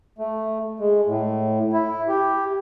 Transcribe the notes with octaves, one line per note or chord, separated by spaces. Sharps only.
A3
G#3
A2
E4
G4